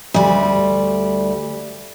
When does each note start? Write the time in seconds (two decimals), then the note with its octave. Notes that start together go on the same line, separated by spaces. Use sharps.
0.14 D2 G3